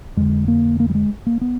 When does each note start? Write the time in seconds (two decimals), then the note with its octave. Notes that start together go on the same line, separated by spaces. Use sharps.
0.17 F2 D3 G#3
0.48 A#3
0.80 A#3
0.89 G3
0.95 G#3
1.26 A#3
1.41 B3